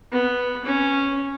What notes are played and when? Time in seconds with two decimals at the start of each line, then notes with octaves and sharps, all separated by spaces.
0.12 B3
0.65 C#4